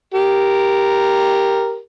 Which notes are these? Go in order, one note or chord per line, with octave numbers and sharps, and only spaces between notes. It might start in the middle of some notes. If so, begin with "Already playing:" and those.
G4 A#4